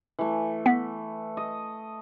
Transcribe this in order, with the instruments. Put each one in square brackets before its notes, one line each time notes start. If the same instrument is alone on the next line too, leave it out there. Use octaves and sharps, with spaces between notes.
[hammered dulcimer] E3 A3
[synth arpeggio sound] B3 F#5 B6
[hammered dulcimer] D#5